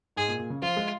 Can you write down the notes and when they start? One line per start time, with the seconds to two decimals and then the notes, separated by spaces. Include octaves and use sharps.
0.16 G#2 G#4
0.28 A#2
0.39 A#2
0.50 C#3
0.62 F3 F4
0.77 G#3